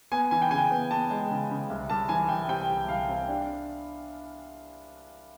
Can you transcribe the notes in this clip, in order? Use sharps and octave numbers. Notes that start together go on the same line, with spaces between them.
B3 G#5
E3 G#5
G5
C#3 G#5
B3
B3 A5
G#3
C#3
C#3
C2
C2 A5
E3 G#5
C2 G5
C3 G5
C2
C2 F5
C3
D4